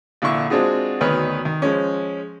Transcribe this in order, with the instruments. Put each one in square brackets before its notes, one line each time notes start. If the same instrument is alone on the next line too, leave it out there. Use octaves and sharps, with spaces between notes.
[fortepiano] A#1 D3 E4 C#6
G#3 C4 D4 F4 F#4 G#4
D2 B2 D#3 B4 C#5 F6
D#3
F3 G#3 C#4